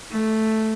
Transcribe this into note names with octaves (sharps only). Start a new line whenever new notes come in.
A3